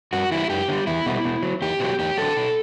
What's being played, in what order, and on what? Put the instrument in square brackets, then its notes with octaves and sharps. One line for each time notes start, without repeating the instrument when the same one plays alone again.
[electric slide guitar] G2 F#4
E3 G3 E4
F#2 G4
D3 G3
E2 E4
B2 G3
B2
F#3
E2 G4
B2 F#3
E2 G4
D3 F#3 A4
B2